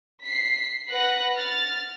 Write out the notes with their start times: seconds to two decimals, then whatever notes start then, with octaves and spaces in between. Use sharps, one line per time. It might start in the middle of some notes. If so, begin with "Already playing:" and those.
0.24 B6 C7
0.89 B4 F#5 F#6 A#6
1.36 F6 A6